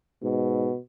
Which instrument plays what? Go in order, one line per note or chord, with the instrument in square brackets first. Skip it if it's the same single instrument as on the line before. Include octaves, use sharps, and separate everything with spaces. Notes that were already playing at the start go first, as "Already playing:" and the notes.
[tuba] G#2 [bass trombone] B2